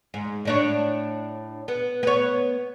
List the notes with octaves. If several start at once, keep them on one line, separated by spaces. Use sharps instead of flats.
G#2
A2 D4 C#5
B3
B3 C#5